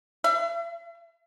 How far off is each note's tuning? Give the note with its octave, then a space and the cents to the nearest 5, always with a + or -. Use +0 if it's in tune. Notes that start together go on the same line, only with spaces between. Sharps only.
E5 +45